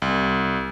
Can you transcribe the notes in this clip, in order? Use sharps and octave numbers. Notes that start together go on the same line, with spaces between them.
C2